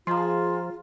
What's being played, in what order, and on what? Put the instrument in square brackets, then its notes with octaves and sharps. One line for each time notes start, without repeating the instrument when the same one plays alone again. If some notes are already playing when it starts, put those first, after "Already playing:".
[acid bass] F3 [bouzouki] G#3 G#4 [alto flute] F4 [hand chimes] A#5 C6